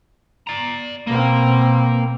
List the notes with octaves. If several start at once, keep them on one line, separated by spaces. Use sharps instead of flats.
D5 A#5
B2 A#3 C4